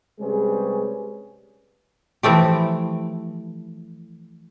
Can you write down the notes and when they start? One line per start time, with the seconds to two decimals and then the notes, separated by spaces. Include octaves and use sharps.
0.19 C3 G3 G#3 C#4 G#4 B4
2.23 E3 F3 A3 G4